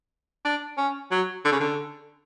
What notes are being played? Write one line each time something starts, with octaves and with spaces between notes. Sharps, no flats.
D4
C#4
F#3
D3
C#3
D3